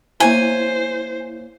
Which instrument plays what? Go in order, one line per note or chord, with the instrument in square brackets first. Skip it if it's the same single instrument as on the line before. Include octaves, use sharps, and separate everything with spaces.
[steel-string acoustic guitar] A#3 C#5 A#5 [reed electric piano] E4 [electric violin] C5 [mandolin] G#5